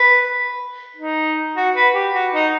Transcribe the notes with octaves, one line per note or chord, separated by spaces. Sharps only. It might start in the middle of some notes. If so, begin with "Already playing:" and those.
Already playing: B4
D#4
F#4
B4
G4
F#4
D#4